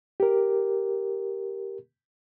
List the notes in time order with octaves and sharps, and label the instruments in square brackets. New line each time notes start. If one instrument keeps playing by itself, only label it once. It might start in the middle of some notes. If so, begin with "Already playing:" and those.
[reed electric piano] G4 A#4